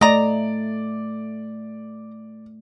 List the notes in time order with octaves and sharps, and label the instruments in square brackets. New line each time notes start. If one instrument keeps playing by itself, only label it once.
[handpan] A3 [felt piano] D5 [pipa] D#5 A#5